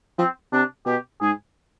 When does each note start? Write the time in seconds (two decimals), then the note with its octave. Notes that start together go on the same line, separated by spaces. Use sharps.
0.18 F3 C4
0.52 C3 D4
0.86 B2 G4
1.21 G#2 G#4